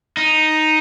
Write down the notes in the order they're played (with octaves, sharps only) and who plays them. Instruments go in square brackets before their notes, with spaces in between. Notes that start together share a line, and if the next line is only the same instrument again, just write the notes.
[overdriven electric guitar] D#4